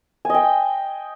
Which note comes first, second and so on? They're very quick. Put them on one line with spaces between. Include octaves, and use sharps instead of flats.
G#5 D#5 G5